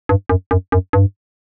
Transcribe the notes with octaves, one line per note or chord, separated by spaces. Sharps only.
G2
F#2
F#2
F#2
G2